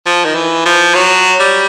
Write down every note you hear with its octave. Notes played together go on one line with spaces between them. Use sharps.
F3
D#3
E3
F3
F#3
G3